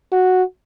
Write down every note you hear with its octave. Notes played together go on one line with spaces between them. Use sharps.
F#4